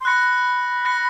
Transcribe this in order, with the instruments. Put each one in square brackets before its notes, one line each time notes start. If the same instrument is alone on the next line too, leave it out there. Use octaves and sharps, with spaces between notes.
[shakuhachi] C6
[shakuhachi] B5 [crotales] F#6 A#6 C#7
[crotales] F#6 A#6 C#7